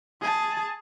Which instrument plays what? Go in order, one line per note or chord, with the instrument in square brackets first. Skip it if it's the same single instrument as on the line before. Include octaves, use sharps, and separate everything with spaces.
[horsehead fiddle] G#4 A5